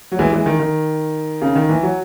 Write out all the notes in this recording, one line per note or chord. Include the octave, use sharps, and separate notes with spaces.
F#3
E3 G#3
E3 G#3
D#3
D#3
C#3
D#3
E3
F#3